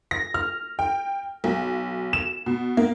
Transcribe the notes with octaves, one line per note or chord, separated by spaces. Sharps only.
A#6
F6
G5
B1
E7
B2
A#3